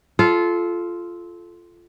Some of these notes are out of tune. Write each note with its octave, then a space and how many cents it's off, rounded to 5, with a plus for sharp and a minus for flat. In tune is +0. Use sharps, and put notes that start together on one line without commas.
F4 -10 A4 -25